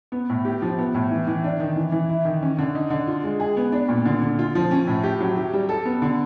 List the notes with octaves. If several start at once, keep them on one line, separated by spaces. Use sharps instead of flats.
B3
A2
G4
F3
B3
A2
E3
E3
D4
D#3
E3
E3
E4
D#3
C#4
D3
D#4
D3
F4
G#3
G#4
B3
D4
A#2
D3
D3
F4
F3
C#4
A2
G4
F#3
G4
G3
A4
B3
D3